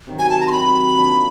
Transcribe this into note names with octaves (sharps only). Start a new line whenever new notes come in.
C3 D#3 F#3
G#5
A5
A#5
C6
C3 D#3 F#3 B5
F3 A#3 D4